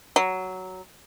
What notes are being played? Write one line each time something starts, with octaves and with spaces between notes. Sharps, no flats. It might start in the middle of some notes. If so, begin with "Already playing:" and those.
F#3